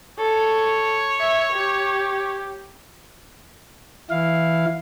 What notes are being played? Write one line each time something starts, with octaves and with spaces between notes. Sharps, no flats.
A4 C#5
E5
G4
E3 E4 F5